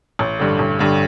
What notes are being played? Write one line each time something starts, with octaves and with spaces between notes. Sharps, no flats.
A1
G2 D3
A1
G2 D3